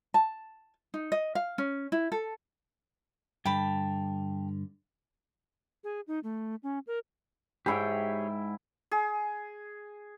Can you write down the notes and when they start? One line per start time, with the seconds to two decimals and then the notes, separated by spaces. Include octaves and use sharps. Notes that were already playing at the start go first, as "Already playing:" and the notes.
0.14 A5
0.94 D#4
1.12 D#5
1.35 F5
1.58 C#4
1.92 E4
2.12 A4
3.45 G2 D3 G5 A5 B5
5.84 G#4
6.08 D#4
6.24 A3
6.63 C#4
6.87 A#4
7.66 G#2 E4 G4 G#4 C#5 G5
8.91 G#4